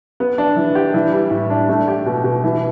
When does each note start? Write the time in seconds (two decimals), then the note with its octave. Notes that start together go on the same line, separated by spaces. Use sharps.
0.20 B3
0.38 D4
0.56 E3
0.75 G4
0.94 E3
1.12 G3
1.31 A2
1.50 D4
1.69 A3
1.88 G4
2.06 B2
2.24 B2
2.44 E3